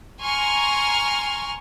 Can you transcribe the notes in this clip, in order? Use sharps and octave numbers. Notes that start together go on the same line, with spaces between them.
G#5 A#5 C6 C#6 F6